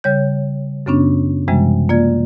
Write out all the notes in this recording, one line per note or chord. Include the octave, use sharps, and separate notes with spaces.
C#3 G3 C#5 G6
F#2 C#3 B3 C#4 D4
F#2 C3 E3 G3 G#3
A#3 F4 D5 G#6